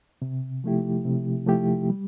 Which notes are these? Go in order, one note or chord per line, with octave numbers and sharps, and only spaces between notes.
C3
F3 A3 E4 G4
C3
F3 A3 E4 G4
G3